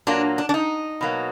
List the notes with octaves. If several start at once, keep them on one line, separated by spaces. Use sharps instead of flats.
A#2 F#3 A#3 D4
D4
D4
D#4
B2 F#3 A#3